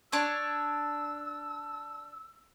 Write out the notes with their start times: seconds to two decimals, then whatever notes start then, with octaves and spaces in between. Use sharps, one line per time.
0.12 D4 C#5 E6